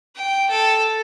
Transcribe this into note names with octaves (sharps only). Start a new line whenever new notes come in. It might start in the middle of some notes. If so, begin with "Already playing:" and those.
G5
A4